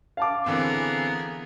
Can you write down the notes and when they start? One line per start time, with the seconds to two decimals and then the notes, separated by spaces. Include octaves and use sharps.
0.17 F5 A5 D6
0.46 D3 E3 B3 C4 G#4 A#4